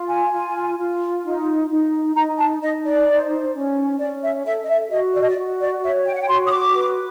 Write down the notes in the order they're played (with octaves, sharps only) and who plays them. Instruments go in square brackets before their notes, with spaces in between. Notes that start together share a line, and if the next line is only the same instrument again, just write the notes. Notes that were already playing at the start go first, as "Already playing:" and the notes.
Already playing: [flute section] F4
G#5
F4
F4
D#4
D#4
D#4 A#5
A5
D#4 D#5
D5
C5
C#4
C#4 D5
E5
A4 E5
D#5
E5
F#4 D#5
D5
D#5
D5
F#4
D5
C#5 E5
G5
F#5
G5
F#4 C6
D#6
D6
B4